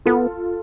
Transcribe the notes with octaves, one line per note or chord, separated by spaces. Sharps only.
B3 F4 A4